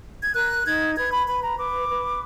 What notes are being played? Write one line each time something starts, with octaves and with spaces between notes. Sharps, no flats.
G#6
A#4 F#6
D#4 G#6
B4 G#6
B5
B4 B5
A#5
B4 D6
B4